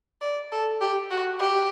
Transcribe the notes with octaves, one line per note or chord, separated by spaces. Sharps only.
D5
A4
G4
F#4
G4